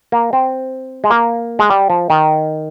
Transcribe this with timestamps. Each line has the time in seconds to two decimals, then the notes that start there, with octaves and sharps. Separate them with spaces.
0.12 A#3
0.33 C4
1.04 G#3
1.10 A#3
1.59 G#3
1.70 G3
1.90 F3
2.10 D#3